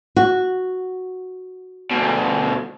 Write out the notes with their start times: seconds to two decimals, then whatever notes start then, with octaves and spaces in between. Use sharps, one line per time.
0.17 F#4
1.91 D2 B2